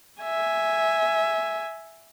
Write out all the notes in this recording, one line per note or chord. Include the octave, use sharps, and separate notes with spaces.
E5 G#5